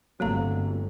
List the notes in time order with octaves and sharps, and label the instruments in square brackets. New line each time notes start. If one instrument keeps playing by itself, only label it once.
[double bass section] G1 [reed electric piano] F#3 A3 C4 [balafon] A#3 F5 A#5